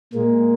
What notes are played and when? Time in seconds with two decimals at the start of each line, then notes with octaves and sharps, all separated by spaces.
0.13 A#2 G#3 A#3